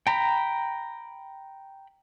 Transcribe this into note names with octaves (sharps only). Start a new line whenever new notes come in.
G5 A#5 B5